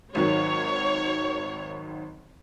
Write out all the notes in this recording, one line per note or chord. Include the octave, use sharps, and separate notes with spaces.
G#1 D#3 F#3 C#5